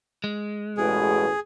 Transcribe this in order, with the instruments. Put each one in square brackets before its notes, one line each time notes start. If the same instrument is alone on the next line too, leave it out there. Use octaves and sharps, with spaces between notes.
[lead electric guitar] G#3
[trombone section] A1 E2 B2 [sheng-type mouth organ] G#4